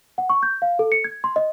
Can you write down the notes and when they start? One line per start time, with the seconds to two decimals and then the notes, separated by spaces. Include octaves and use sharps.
0.18 F#5
0.30 C#6
0.43 G6
0.62 F5
0.79 A4
0.92 C#7
1.04 G#6
1.24 C6
1.36 D#5